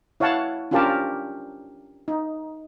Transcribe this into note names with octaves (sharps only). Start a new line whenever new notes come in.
E4 C#5 F5 F#5 A5
C#4 D4 F4 G4 A#4 A5
D#4